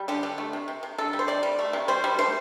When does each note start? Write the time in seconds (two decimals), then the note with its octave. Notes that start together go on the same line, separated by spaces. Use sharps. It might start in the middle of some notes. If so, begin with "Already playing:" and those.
Already playing: G3
0.08 D3 G4
0.23 D3
0.38 A3
0.53 C3
0.68 C3
0.83 C3
0.98 D3 A4
1.13 G3
1.19 C5
1.28 C3 D5
1.43 G3
1.59 A3
1.73 C3
1.88 G3 C5
2.04 G3
2.19 A3 C5